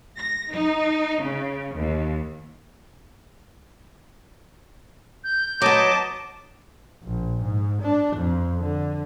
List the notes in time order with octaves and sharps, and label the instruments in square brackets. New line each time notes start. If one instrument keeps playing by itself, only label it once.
[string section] A#6
D#4
C#3
D#2
[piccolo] G6
[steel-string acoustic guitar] F#3 B3 [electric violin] D#5 A5 [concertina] D6
[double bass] A#1
G#2
D4
F2
D3